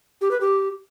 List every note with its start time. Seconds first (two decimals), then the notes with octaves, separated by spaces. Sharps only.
0.21 G4
0.31 B4
0.41 G4